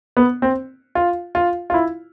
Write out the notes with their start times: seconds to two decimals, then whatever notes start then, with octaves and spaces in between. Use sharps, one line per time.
0.17 B3
0.42 C4
0.95 F4
1.35 F4
1.70 F4
1.74 E4